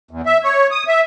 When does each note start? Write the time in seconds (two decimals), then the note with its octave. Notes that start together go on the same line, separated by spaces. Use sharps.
0.11 E2
0.26 E5
0.44 C#5
0.71 D#6
0.87 E5